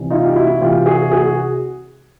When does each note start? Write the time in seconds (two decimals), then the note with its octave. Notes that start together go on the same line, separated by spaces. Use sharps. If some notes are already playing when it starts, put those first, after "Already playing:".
Already playing: C2 C3 E3
0.10 D#4 F4
0.26 G4
0.36 E4 F#4
0.61 C2 C3 E3 F4 G4
0.86 F#4 G#4
1.12 F#4 G#4